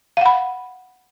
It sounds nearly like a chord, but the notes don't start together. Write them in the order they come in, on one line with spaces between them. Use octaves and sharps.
F5 F#5 B5